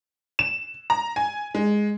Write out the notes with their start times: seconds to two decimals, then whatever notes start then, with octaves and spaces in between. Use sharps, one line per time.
0.39 E7
0.90 A#5
1.16 G#5
1.55 G#3